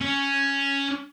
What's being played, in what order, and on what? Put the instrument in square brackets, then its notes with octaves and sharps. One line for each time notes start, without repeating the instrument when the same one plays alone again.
[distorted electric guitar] C#4